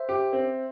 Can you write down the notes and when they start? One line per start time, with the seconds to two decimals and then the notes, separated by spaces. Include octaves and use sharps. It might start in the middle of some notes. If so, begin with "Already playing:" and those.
Already playing: C5 E5
0.09 G4
0.33 C4